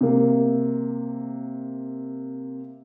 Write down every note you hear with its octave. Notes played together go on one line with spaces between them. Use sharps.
C3 A#3